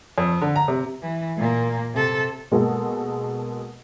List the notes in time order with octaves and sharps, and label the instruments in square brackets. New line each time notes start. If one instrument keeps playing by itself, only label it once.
[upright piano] F2
D3
A#5
C3
[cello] E3
A#2 A#3
C3 A4
[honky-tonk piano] B2 G#3 A#3 F#4 A4